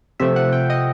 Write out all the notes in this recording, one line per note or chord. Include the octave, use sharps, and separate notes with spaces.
C3 F3 A3 E5
F#5
G5
D#5